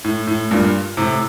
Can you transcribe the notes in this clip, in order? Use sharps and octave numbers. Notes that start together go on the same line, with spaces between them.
A2
A2
G2 A#2
A2 C3